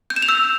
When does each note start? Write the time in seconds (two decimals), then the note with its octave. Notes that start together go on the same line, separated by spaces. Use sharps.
0.10 G6
0.16 E7
0.22 F7
0.28 E6